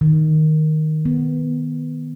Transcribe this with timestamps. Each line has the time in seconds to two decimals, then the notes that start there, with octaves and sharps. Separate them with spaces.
0.01 D#3
1.05 B3